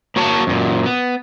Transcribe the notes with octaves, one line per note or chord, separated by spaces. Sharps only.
A#3 F#4 C#5 A5
F#2 A#2
B3